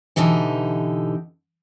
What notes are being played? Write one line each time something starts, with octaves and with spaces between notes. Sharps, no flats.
B2 D3 E3 D#4 G4